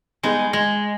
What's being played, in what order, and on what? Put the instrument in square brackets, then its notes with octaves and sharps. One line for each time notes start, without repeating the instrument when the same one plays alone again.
[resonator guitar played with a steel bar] G3 B3 D#4 G#4 [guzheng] G#3
[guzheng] G#3